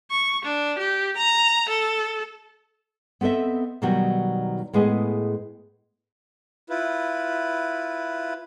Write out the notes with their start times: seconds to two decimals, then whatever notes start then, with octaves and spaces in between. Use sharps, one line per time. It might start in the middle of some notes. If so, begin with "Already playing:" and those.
0.10 C#6
0.45 D4
0.79 G4
1.17 A#5
1.69 A4
3.21 B3 C4 A4 D#5 E5
3.82 B2 D#3 F#3 G3 F#4
4.73 A2 G#3 B3 G#4 D#5
6.70 E4 F4 B4